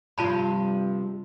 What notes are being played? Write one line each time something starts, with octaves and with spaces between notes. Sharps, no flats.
G2 C3 F3 F4 A5 B5